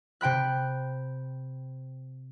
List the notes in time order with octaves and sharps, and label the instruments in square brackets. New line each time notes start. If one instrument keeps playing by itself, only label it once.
[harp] C3 G5 B5 F#6